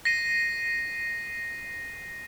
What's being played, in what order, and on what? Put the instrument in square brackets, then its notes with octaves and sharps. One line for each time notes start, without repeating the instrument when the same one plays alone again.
[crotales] A#6 C7 D#7